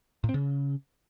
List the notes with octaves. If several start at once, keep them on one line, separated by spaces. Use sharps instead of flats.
A2
C4
C#3